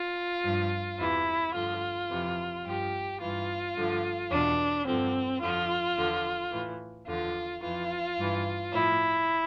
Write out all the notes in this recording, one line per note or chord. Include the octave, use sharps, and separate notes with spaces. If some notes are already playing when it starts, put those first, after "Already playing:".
Already playing: F4
G2 F3
E2 C3 E3 E4
G2 D3 F3 F4
F2 C3 E3
G2 F3 G4
G2 E3 F4
G2 D3 F3
E2 B2 D4
G2 D3 F3 C4
F2 D3 F3 F4
E2 D3 F3
A2 E3
E2 D3 F3 F4
F2 E3 F4
G2 E3
A2 F3 E4